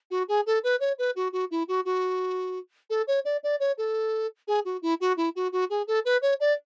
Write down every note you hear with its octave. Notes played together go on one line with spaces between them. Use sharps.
F#4
G#4
A4
B4
C#5
B4
F#4
F#4
E4
F#4
F#4
A4
C#5
D5
D5
C#5
A4
G#4
F#4
E4
F#4
E4
F#4
F#4
G#4
A4
B4
C#5
D5